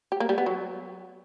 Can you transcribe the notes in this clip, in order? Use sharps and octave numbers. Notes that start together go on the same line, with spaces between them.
G4
A#3
G3
B3
F#3